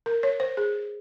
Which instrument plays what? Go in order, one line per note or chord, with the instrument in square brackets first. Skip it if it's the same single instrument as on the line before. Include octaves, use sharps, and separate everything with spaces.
[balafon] A#4
C#5
C5
G#4